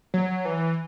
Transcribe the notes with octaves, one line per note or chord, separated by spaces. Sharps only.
F#3
E3